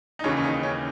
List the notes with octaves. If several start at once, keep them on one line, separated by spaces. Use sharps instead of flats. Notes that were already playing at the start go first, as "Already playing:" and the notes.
D#4
D#2 C#3 E3 C#4
C#4
D#4
C#4